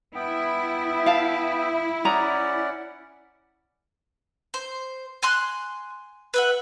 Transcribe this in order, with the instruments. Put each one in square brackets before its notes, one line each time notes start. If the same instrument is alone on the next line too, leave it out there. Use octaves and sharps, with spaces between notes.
[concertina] B3 G5 [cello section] E4
[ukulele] F5 A5
[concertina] C#4 D5 F#5 [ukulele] G#4 A#5
[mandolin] C5
G#5 C6 F#6
B4 E5 F#5